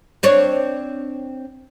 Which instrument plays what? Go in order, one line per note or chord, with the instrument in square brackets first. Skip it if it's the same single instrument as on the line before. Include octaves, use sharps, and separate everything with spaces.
[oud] C4 D4 C#5